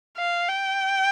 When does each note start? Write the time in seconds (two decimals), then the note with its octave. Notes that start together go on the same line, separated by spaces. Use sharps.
0.18 F5
0.49 G5